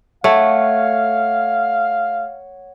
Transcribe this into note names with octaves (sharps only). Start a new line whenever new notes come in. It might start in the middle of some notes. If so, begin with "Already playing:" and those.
A3 C#5 F5 F#5